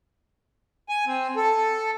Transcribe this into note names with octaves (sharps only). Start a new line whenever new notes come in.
G#5
C4
A4